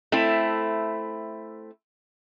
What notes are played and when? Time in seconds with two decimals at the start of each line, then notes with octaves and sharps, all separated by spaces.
0.12 A3 C4 E4